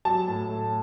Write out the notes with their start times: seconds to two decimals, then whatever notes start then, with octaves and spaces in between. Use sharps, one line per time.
0.05 F#3 A5
0.28 A2
0.50 A3